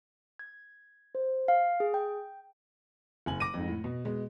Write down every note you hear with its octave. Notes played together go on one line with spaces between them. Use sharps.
G#6
C5
F5
G#4
G5
F#1 G#5 F#7
D6 A#6 D#7
F2 G#2
A2
B2
B2 G#3